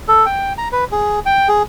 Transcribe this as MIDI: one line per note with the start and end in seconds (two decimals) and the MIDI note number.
0.08 0.26 69
0.26 0.53 79
0.58 0.69 82
0.72 0.84 71
0.92 1.20 68
1.26 1.48 79
1.48 1.63 68